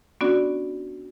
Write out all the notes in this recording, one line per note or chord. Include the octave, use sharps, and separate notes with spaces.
B3 C#4 D4 F#4 D5